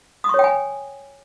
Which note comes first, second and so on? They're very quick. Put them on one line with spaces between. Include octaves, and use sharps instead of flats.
D#6 C#6 C#5 G5 G#5